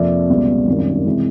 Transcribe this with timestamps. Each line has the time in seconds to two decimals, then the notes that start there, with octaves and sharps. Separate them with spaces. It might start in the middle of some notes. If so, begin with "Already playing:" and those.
Already playing: F2 C3 F3 A#3 D5 E5
0.29 C#2 B2 G3 B3
0.67 G#1 F#2 D#3 G3
1.06 C3 E3 G#3